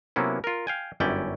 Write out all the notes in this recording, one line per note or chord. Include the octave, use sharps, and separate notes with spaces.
C3 F#3 A#3 B3 C#4 E4
F4 A#4
F5 G5 G#5
G1 F#2 C#4 E4 D5 G5